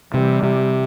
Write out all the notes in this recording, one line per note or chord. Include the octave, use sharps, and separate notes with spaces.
C3 E3 G3
C3